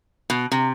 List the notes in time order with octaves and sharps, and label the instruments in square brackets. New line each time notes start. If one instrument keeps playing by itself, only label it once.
[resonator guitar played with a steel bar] B2
C3